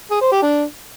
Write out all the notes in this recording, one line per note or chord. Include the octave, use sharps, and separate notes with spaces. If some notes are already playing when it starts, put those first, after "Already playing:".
G#4
C5
G4
D4